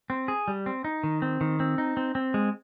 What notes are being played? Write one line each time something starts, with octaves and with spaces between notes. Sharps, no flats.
C4
G#4
G3
C4
D#4
D#3
C4
D#3
C4
D#4
C4
C4
G#3